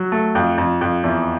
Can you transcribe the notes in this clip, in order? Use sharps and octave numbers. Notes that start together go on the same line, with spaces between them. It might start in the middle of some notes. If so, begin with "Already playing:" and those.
Already playing: F#3
A3
F2
F2
F2
E2